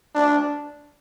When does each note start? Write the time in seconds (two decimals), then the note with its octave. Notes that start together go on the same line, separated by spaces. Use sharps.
0.15 D4